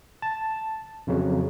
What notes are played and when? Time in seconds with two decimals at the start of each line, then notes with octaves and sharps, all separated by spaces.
0.22 A5
1.07 F2 C#3 F#3